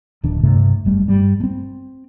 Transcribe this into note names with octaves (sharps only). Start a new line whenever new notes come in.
D1 D#3 D4
G2 C3 A3
F#1 G3 A3
G2 G3
A3 C4